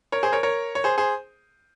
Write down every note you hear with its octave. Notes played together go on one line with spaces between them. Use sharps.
A#4 C#5
G#4 C5
A#4 C#5
A#4 C#5
C#5
G#4 C5
G#4 C5